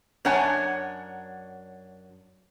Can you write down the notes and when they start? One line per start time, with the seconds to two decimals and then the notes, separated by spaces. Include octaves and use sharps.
0.25 F#2 D4 C#5 F#5 G#5 A5